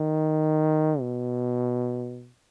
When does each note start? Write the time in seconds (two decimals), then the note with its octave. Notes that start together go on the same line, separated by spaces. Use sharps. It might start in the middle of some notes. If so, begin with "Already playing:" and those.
Already playing: D#3
1.00 B2